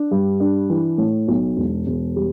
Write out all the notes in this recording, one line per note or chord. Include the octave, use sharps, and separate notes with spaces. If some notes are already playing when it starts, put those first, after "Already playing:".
Already playing: D4
G2
D4
E3
A2
B1
E1
E1
G3